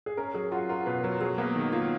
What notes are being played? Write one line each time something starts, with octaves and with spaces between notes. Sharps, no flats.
G#4
C#4 A#4
F#3 G#4
F4 F#4
F4 A#4
B2 B4
F#3 A#4
F#3 G#4
A#3 B3
D#3
A#3 F4